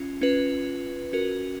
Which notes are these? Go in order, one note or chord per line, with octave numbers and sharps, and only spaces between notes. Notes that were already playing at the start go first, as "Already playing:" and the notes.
Already playing: C#4 F4
C#4 F4 B4
C#4 F#4 A#4